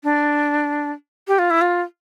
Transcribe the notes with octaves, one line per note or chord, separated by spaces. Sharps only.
D4
G4
F4
E4
F4